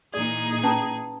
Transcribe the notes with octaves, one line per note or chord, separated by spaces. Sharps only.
A#2 E3 D#4 G#4 D5
C#4 B4 A5 A#5